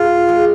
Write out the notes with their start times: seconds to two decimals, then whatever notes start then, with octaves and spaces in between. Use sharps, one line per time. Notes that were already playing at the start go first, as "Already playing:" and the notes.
Already playing: G#2 F4
0.27 D#3 G#3